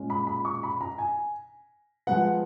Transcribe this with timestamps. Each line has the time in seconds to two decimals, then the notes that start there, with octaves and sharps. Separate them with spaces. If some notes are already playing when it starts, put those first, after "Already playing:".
Already playing: A#2 G#3 C#4
0.10 B5
0.27 B5
0.45 C#6
0.63 B5
0.81 A#5
0.98 G#5
2.07 F3 G#3 B3 F#5